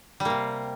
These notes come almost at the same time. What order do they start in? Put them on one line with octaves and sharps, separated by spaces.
G3 A#3 C3